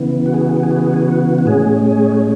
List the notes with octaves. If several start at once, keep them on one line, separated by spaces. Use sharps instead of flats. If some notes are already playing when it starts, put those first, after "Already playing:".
Already playing: C#3 E3 B3
F#4
G#4
F#4
G#4
F#4
G#4
F#4
G#4
F#4
G#4
F#4
F#4
A2 G#3 C#4 G#4
G#4